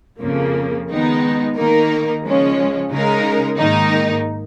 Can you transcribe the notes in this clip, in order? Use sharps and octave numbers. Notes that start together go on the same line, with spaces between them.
F2 C#3 F3 A#3
D#3 G#3 B3 D#4
D#3 A#3 D#4 A#4
C#3 F3 G#3 C#4
C#3 G#3 D#4 A#4
G#2 D#3 A#3 D#4